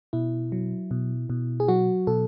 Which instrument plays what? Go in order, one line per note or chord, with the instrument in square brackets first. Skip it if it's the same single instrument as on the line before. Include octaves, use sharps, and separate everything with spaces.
[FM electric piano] B2 E4
F#3
B2
B2
G#4
F#3 F#4
B2 A4